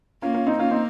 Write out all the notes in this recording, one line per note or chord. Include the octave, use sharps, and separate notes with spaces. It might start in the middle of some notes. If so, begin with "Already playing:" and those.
A#3 C#4 F4
C#4 F4
C4 D#4
A#3 C#4 F4
C4 D#4